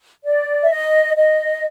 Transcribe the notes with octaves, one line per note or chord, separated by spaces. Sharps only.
D5
E5
D#5
D#5